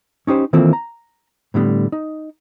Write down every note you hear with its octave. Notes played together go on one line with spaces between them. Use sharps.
C#4 D#4 G4 C5
D#3 E3 A#3 C4 F4 A4
A#5
A2 D3 G3 B3
D#4